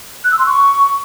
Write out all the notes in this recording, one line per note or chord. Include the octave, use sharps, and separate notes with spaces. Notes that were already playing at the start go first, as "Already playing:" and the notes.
F#6
E6
C6
C#6